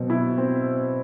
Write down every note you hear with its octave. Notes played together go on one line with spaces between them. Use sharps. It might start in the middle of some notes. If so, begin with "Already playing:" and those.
Already playing: B2 F#3 C4
E4
C4